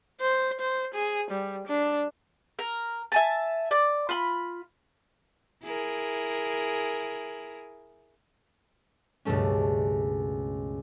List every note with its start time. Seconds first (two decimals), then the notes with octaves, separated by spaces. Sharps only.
0.21 C5
0.60 C5
0.94 G#4
1.31 G3
1.67 D4
2.59 A#4
3.12 E5 G#5 A5
3.71 D5
4.09 F4 B5
5.64 E4 G#4 A#4
9.25 C#2 G2 B2 G3 A3 C#4